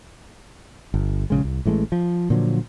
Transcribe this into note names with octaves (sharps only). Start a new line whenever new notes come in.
G1
A#1 C#3 G#3
C2
A1 E3 G#3 A3
F3
A#2 D3 F3 F#3